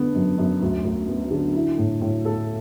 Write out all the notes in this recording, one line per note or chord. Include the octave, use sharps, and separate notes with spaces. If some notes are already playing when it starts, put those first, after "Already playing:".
Already playing: D3 B3
F#2
F#2
D2
D2
B3
D3
E4
A2
A2
A4